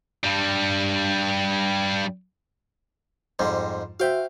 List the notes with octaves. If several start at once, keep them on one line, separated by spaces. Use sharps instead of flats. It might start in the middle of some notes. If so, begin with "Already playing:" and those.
G2 G3
F2 G#2 G3
F#4 C5 E5 F5 G5